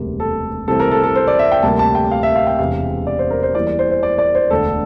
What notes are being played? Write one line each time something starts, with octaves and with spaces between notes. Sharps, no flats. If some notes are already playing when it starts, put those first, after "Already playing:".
Already playing: E1 D2 C3 G3 A#3
A4
C2 C3 E3 A3 C4 A4
A#4
A4
A4
C5
D5
E5
G5
D2 C3 G3 A#3 A5
A5
G5
F5
E5
F5
G5
E1 E2 C3 F5
D5
C5
A#4
C5
E2 E3 G3 A#3 D5
D5
C5
C5
D5
D5
C5
E1 D2 D3 A4